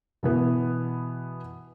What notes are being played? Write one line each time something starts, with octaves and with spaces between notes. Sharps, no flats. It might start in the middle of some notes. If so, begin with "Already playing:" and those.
B2 E3 B3